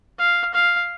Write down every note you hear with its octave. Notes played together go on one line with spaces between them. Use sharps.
F5
F5